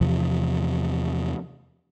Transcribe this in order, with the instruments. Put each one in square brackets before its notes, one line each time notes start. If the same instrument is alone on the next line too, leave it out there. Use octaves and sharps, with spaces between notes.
[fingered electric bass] E2 C3 F3